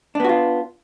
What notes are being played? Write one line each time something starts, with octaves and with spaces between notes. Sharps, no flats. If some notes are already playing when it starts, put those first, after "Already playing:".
B3 D4 F4 F#4